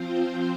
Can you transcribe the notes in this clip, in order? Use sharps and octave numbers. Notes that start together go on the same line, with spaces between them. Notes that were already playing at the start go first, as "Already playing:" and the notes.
Already playing: F3 C4 F4 C5